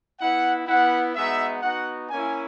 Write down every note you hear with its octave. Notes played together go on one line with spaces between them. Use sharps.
B3 E4 F#5
B3 E4 F#5
G#3 B3 D#4 F#4 E5
B3 D#4 F#4 F#5
A#3 C#4 E4 G#5